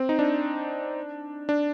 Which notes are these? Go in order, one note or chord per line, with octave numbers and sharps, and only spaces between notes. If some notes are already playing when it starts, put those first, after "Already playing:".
Already playing: C4
D#4
D4
D4